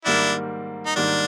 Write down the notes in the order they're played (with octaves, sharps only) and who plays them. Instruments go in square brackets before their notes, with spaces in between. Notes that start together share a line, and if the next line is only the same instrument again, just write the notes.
[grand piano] G#2 D#3 G3 A#3 [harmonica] D4 E4
[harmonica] D#4
[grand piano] G#2 D#3 G3 A#3 [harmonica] D4